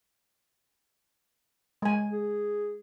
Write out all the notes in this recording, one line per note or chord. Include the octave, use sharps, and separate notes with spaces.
G#3 G#5
G#4